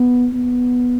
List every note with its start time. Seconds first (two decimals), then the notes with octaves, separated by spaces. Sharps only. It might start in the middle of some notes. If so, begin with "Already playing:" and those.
Already playing: B3
0.34 B3